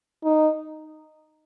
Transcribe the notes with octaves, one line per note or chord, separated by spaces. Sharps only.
D#4